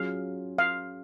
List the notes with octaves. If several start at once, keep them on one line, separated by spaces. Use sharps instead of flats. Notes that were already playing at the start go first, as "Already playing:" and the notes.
Already playing: F#3 C#4 F4 G#4 F5
F5